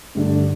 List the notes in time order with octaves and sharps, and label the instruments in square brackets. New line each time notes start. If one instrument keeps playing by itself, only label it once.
[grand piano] G2 D3 A3 D4